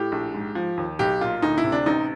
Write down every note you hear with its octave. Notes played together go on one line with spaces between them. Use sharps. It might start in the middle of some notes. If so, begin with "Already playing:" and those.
Already playing: A2 G4
A#1
G#2
F3
D#2
B1 G4
A#2 F4
D2 D#4
E4
C3
D4
A1 D#4